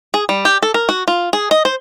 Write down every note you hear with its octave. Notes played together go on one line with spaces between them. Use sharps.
G#4
G3
G4
A4
A#4
F#4
F4
G#4
D#5
C5